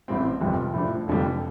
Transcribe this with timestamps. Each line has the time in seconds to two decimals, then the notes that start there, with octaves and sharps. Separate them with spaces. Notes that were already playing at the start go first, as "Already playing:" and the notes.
0.08 A1 A2 G3 C4
0.41 G1 F2 C3 G3
0.74 A2 F3 D4
1.07 F1 F2 D3 G3